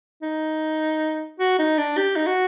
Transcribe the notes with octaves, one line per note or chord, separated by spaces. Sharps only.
D#4
F#4
D#4
D4
G4
D#4
F#4